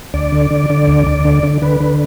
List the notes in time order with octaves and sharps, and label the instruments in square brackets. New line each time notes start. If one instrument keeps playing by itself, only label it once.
[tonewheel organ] D2 D5
D3
D3
D3
D2
D2
D3
D3
D3 B4
D3